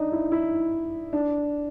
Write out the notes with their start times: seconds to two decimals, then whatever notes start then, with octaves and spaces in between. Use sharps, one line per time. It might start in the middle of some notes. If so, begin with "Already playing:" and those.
Already playing: D4 D#4
0.12 E4
0.32 E4
1.13 D4